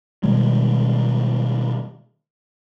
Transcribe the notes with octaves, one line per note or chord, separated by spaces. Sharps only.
B2 D#3 G3 G#3